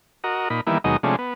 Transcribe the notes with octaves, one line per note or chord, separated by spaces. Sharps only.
F#4 A#4 D#5
A#2 D#4 B5
D#3 E3 G3 A#3 B3 E4
D#2 B2 F#3 G#3 D#4 D#5
C3 F3 G#3 A3 C#4 D4
B3